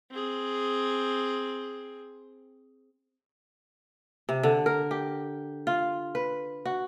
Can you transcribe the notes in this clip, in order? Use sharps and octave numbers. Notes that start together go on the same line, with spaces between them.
C4 G#4
C3
D3
A#4
G4
F4
B4
F#4